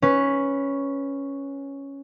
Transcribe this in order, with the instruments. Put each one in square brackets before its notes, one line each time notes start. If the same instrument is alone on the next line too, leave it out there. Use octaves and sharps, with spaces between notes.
[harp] C#4 B4